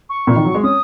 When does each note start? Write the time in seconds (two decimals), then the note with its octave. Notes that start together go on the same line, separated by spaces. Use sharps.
0.09 C#6
0.27 A#2
0.36 D#3
0.45 F#3
0.54 G#3
0.63 C#4 D#6